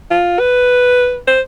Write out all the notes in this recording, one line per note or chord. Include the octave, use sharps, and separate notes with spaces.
F4
B4
C5